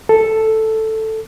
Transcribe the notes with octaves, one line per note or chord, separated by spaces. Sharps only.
A4